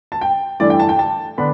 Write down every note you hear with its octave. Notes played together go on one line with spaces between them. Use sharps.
A5
G5
G2 E3 A3 D5
G5
A5
G5
A5
D3 B3 D4 B5